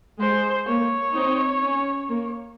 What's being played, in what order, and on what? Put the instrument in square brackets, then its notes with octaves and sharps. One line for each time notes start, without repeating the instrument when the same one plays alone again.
[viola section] G#3 [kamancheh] C5
[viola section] A#3 [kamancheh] C#5
[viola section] C4 D#4
C#4
A#3